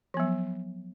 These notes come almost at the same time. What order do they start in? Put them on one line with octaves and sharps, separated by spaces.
F3 B3 F#3